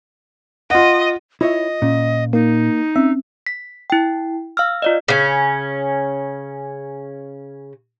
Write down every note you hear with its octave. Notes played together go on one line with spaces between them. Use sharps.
F4 D#5 F#5
E4 F4 C#5 D#5 E5
A#2 C#4
A#3 D#4
C4 C#4 E5
B6
E4 G5
F5 E6 F6
F4 D5 D#5
C#3 C#4